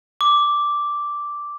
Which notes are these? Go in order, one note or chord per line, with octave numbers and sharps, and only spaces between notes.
D6